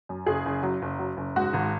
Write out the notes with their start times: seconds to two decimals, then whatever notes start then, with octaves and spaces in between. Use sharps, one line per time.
0.09 F#2
0.26 F#1 G#4
0.45 F#1
0.63 F#3
0.82 F#1
0.99 F#3
1.17 F#1
1.36 G#2 F#4
1.53 G#1